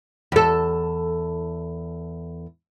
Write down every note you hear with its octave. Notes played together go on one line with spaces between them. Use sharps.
E2 A4